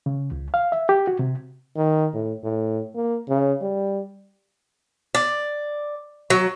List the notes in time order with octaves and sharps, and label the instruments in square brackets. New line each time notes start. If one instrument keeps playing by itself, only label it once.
[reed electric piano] C#3
C#2
F5
E5
G4
F#4
C3
[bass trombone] D#3
A2
A2
A#3
C#3
G3
[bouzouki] D5
F#3